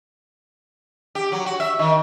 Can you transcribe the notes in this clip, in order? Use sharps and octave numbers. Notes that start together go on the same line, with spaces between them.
G4
F#3
F#4
E5
D#3